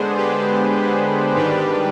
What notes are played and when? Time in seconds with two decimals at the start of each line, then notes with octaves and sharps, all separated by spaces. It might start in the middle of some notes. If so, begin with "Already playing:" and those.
Already playing: D3 G#3 B3 D4 G#4 C5
0.17 G4 B4
1.35 G#2 D#3 G3 D4 G4 B4